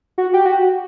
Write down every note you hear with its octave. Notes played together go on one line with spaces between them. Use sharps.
F#4
G4
F#4